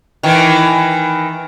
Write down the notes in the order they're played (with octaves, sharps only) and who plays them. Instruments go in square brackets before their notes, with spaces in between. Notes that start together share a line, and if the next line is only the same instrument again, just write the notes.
[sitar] D#3 E3